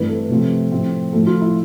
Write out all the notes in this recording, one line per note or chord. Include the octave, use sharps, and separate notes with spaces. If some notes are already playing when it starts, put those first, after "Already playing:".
Already playing: G2 E3 A3 C4 B4
A4
C3 F3 A3 C4
A2 F3 C4
A2 F3 A3 A4
F4
E4